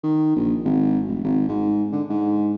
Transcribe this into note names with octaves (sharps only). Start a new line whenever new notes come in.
D#3
A#1
G#1
F1
G#1
G#2
D3
G#2